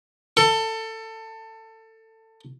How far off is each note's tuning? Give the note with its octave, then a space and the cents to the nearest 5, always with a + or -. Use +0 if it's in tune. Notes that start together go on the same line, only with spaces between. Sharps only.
A4 +20